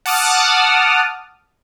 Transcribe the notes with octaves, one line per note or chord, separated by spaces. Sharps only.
F#5 A5 D6 D#6 F6